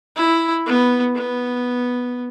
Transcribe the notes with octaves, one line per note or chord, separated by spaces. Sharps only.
E4
B3
B3